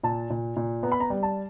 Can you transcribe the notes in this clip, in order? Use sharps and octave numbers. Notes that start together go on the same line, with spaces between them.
A#2 A5
A#2
A#2
B3 A#5
B5
A#5
G3
A5